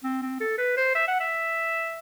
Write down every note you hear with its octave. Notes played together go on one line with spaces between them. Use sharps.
C4
C4
A4
B4
C5
E5
F#5
E5